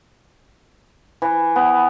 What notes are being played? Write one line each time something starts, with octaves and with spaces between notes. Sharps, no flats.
E3
B3